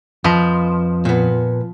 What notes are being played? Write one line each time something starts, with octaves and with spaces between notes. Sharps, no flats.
F2 F3 B4 D#5
A#2 B3